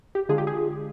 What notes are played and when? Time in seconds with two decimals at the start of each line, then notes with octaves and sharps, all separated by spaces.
0.15 G4
0.29 D3 G#3 D4 F4 G#4
0.38 G4
0.47 G#4